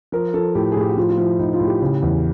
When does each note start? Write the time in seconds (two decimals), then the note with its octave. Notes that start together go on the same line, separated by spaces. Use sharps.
0.12 F3 A#4
0.34 F3 A4
0.55 A2 G4
0.72 G#4
0.76 A2 G4
0.89 F#4
0.97 F3 F4
1.10 F4
1.18 F3 E4
1.39 A2 D#4
1.53 F4
1.60 A2
1.67 G4
1.82 C#3
2.02 E2